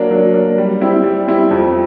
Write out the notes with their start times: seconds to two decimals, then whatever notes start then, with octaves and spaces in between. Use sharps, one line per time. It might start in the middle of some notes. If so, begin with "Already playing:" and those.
Already playing: F#3 A#3 D4
0.11 F#3
0.34 A#3 D4
0.58 G3
0.81 C4 E4 G4
1.04 G3
1.27 C4 E4 G4
1.51 F2